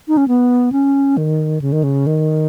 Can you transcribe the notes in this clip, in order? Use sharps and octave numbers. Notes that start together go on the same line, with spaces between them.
D#4
C#4
B3
C#4
D#3
C#3
D#3
C#3
D#3